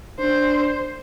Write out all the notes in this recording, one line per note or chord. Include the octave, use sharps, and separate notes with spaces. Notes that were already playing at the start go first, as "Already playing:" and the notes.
D4 C5